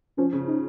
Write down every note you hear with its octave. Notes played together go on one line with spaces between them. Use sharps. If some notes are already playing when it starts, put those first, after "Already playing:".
F3 C#4
C#3
D#4